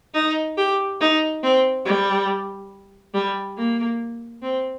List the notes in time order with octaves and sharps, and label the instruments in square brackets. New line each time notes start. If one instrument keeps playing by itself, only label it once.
[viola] D#4
G4
D#4
C4
G3
G3
A#3
C4